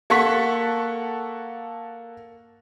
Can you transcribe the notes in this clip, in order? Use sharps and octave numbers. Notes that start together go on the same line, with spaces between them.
A#3 A4 F#5 C#6 B6